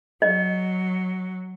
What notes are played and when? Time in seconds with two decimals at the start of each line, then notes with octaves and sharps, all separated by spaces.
0.22 F#3 D#5